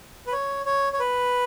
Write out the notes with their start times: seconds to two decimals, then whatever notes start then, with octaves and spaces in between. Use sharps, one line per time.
0.27 B4
0.32 C#5
0.66 C#5
0.93 C#5
1.00 B4